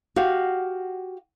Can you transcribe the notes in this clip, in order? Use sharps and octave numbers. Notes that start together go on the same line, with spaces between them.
F#4 G4 F5